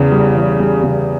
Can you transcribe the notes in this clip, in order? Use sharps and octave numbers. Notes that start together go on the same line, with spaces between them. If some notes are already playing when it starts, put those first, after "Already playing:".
Already playing: E2 C#3
G3
E2
G3
C#3